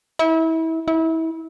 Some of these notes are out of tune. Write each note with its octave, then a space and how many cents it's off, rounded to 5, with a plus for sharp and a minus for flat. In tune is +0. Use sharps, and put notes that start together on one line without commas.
E4 -30
E4 -30